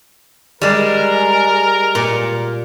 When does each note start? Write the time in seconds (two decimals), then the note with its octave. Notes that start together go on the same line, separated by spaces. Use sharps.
0.61 G3 G#3 A#4
1.95 A#2